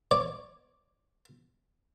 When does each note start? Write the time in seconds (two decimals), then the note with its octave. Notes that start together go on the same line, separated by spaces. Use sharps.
0.11 C#5 D5